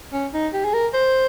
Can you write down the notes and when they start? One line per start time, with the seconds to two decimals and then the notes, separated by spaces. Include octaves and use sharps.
0.13 C#4
0.34 D#4
0.53 G4
0.65 G#4
0.74 A#4
0.94 C5